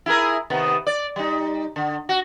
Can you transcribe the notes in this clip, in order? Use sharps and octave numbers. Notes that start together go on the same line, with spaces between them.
E4 G#4 A#4
C3 D#3 B3
D5
G3 D#4
D3
F#4